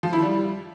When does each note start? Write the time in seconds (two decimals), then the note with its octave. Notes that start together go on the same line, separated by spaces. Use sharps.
0.03 F3
0.13 E4
0.22 G3